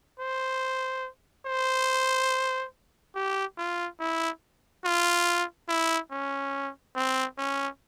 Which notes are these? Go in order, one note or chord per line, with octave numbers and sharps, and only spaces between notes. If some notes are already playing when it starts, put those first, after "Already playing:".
C5
C5
G4
F4
E4
F4
E4
C#4
C4
C#4